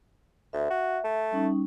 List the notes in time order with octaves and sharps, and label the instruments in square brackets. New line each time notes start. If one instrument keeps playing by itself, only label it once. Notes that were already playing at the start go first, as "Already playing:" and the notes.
[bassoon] D2 [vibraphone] E5
[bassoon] F#4
A3
[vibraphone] G3 C#4 D#4